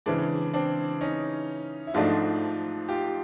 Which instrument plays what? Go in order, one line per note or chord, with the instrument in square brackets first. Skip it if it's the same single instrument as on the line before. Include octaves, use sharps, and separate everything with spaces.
[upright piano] C#3 E3 G#3 [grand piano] C4 D4
[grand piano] C4 D4
C#4 D#4
E4
[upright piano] G#2 F3 A3 D4 F#4 [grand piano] D#4 F4
[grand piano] F4 G4